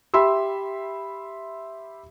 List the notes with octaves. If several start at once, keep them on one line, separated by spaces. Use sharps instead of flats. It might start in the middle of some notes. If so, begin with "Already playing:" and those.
G4 E5 B5 C6 E6